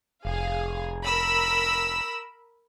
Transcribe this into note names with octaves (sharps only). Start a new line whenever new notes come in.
F1 G#4 F5
A#4 B5 E6